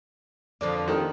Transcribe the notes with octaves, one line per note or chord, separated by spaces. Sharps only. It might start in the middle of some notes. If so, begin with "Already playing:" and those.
F2 D3 F3 B4 D5
D#3 G4 A4